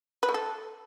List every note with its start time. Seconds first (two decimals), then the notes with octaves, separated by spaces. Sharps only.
0.23 B4
0.29 A3
0.34 A4